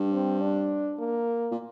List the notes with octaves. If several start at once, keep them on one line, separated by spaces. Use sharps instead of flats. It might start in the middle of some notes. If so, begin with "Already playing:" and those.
Already playing: G2
C4
D4
A#3
A#2